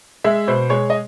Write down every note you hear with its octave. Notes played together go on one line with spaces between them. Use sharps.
G#3 E5
B2 C5
G#3 C#5
D#5